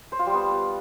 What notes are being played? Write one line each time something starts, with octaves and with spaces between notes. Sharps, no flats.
C5
F4
G3
B3